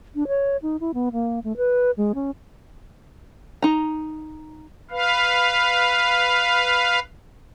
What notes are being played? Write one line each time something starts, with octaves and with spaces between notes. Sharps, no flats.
D4
C#5
D#4
E4
B3
A#3
A3
B4
G#3
C#4
D#4 A#5
B4 F5